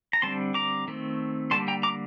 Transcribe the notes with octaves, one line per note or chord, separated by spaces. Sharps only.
A#5
D3 G3 C4 A5 C6
A#5 D6
D#3 A3 C4
D3 G3 A#3 A5 C6
G5 A#5
A#5 D6